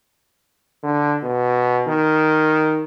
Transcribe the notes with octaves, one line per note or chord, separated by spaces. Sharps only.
D3
B2
D#3